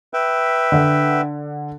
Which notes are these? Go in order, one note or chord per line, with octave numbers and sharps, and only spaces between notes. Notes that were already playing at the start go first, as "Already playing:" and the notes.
B4 E5 G5
D3